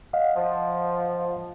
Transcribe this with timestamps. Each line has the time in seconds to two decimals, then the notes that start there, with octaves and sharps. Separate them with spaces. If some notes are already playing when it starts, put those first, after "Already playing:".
0.13 D#5 F5 F#5
0.36 F3